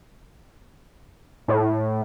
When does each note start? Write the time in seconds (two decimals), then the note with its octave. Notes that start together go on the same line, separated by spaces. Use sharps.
1.48 A2